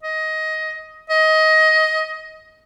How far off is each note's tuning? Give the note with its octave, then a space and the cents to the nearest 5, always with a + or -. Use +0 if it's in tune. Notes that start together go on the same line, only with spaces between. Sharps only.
D#5 +15
D#5 +20